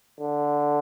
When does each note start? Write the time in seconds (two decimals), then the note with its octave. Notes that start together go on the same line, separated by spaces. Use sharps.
0.20 D3